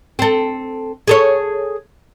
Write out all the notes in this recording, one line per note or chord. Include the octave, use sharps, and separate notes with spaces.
C4 A4
G#4 A4 C#5